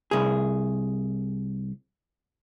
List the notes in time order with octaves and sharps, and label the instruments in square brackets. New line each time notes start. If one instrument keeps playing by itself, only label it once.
[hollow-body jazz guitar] C2 G#4